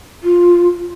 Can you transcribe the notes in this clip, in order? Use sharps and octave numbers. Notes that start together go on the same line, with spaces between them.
F4